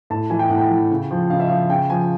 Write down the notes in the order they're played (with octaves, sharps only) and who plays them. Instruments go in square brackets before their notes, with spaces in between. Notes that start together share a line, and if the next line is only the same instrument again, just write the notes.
[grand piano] A2 A5
E3 G#5
G5
A2 F#5
G5
E3
C#3
F3
C#3 F5
E5
F3 F5
C#3 G5
F3 G#5